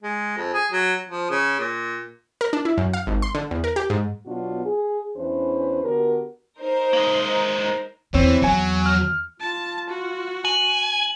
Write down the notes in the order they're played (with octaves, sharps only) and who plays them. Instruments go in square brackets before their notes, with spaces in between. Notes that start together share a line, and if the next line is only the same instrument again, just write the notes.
[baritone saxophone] G#3
F2
G#4
F#3
F3
C#3
A#2
[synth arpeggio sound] A#4
D4
E4
F#2
F5
G#1
C6
D3
E2
A#4
G4
G#2
[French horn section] B2 F#3 B3 D4 F4 F#4
G#4
E2 E3 C#4 D4 B4 C5
D3 B3 F#4 G4 A#4
[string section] D#4 A#4 C5
[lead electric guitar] G#3 A#3
[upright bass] E2 [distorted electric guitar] E3 [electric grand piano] C4 C#5
[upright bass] E2 [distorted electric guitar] F#3 [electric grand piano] G#5 C#7
[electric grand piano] F6
[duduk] F4 [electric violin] A5
[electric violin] F#4
[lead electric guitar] G#5 [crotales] F#7